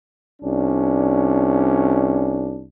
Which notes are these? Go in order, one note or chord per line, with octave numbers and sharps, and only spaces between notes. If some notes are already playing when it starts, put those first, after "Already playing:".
C2 C#4 D4